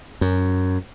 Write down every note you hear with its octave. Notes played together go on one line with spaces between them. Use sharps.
F#2